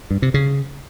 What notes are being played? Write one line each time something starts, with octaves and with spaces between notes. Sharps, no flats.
G2
C3
C#3